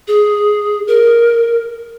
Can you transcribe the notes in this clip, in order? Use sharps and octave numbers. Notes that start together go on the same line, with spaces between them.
G#4
A#4